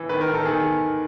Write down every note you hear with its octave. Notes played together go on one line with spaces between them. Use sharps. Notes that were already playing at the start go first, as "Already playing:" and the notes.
Already playing: E3
D#3 B4
A#4
D#3
A4
D#3 G#4